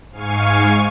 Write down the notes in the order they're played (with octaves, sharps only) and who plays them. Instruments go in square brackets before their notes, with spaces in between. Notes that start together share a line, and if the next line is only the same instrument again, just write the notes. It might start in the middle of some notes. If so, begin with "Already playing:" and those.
[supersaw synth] G#2 F5 G#5 C#6